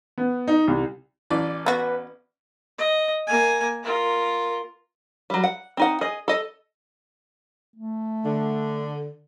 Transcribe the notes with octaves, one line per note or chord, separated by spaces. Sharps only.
B3
D#4
C2
A1 E3 D5
B3 F#4 B4
D#5
A#3 G#5
F4 A#4
F#3 G3
F#5
C4 D#4 F#5
G#4 D#5
A4 D#5
A3
D3